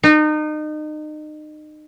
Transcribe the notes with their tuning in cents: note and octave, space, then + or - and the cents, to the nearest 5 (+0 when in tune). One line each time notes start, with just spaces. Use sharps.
D#4 -30